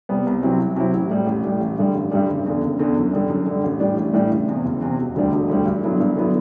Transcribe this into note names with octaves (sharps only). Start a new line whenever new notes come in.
C3 G3 B3
C2
C3 F#3 C4 E4
C2
C3 F#3 C4 E4
A1
A2 G3
A1
A2 G3
A1
G2 D3 G3
A1
G2 D3 G3
F#1
E2 D3
F#1
E2 D3
F#2
D3 G3
F#2
D3 G3
A1
A2 E3 G3 D4
A1
A2 E3 G3 D4
F#1
E2 C3
F#1
E2 C3
E1
D2 D3 G3 D4
E1
D2 D3 G3 D4
G2
D3 F#3 B3 E4
G2
D3 F#3 B3 E4